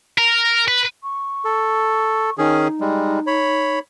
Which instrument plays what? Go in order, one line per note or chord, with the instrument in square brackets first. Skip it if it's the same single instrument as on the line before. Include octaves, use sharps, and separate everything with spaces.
[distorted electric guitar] A#4
B4
[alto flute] C#6
[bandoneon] A4
[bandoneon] D#3 C#4 G#4 [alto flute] D#4
[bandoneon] G3 G#3
C#5 B5